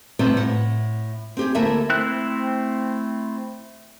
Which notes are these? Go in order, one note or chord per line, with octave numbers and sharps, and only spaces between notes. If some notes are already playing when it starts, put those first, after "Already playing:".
C3 G3 A3 B3 C4
A2 F#5
C4 G4 G#4
D2 A3 A#3 E4 G#4 E5
A3 C4 E4 F#6